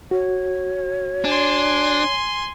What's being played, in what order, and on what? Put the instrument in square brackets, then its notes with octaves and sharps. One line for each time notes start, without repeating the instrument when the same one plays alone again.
[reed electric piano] F#4 [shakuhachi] C#5
[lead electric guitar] D4 [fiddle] G#5 C6